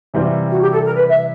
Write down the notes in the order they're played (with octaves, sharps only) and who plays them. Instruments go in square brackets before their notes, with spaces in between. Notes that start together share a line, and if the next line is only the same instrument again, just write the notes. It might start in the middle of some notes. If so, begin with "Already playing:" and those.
[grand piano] C3 E3 G3 C4 F4
[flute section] F#4
G4
A4
A#4
B4
E5